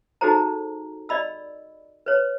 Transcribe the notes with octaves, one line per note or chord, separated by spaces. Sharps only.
D#4 F#4 G#4 A4 C5 A#5
D5 D#5 B5 E6
B4 C#5